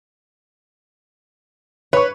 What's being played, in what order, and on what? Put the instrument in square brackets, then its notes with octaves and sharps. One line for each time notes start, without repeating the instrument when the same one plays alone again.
[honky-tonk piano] B4 C#6 [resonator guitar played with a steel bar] C#5